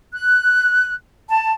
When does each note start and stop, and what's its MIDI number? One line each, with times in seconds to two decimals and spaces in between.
0.13 0.94 90
1.30 1.52 81